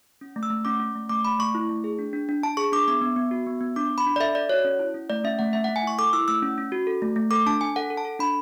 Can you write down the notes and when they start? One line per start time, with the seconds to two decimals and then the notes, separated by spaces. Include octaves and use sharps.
0.21 C#4
0.36 A3
0.43 E6
0.50 A3
0.65 C#4 D6
0.80 C#4
0.95 A3
1.09 A3 D6
1.24 A3 B5
1.39 A3 C#6
1.55 E4
1.69 A3
1.84 G#4
1.99 D4
2.13 D4
2.29 D4
2.43 D4 A5
2.57 G#4 C#6
2.72 D4 D6
2.88 B3 D6
3.01 B3
3.16 B3
3.31 F#4
3.46 B3
3.61 B3
3.76 D4 D6
3.91 D4
3.98 B5
4.06 D4
4.16 D5
4.20 A4 E5
4.35 A4 D5
4.49 F#4 C#5
4.65 C#4
4.79 E4
4.94 C#4
5.10 A3 D5
5.24 C#4 E5
5.39 A3 F#5
5.53 A3 E5
5.64 F#5
5.69 A3
5.76 G#5
5.83 E4 C#6
5.99 A4 D6
6.13 E4 E6
6.28 A3 E6
6.42 C#4
6.58 C#4
6.72 F#4
6.87 A4
7.02 A3
7.16 A3
7.31 A4 D6
7.46 D4 A5
7.61 D4 G#5
7.76 A4 F#5
7.90 A4
7.97 A5
8.05 A4
8.19 D4 B5